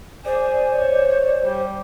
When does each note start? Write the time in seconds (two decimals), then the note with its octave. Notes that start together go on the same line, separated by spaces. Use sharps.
0.25 G#4 C5 D5
0.72 C#5
1.43 G3